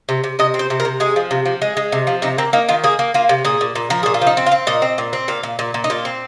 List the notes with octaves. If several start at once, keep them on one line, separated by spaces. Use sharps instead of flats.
C3
C3
C3 D#5
C4
C5
C3
A#4
C3
G#3 G#4
F3
C3
F3
G#3 G#4
G#3
C3
F3
C3 D#4
A#3 C4
A#3 D#4
D#3 F4
A#3 G#4
A#3
A#3 F4
C3
A#2 G#4
A#2
A#2
F3 A#4
A#2 G#4
F4
F3
D#4
C4
F4
C4
A#2 D#5
C4
A#2
C4
A#2 F5
A#2
A#2
A#2
D#4
A#2 F4
C4